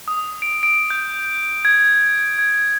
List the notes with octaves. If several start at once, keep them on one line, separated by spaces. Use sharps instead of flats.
D#6
D7
D7
G6
G#6
G#6